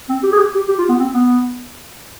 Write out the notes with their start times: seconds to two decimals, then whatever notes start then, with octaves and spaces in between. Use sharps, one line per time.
0.09 C4
0.23 G4
0.32 G#4
0.38 G4
0.54 G4
0.68 G4
0.79 F4
0.89 B3
0.99 C4
1.14 B3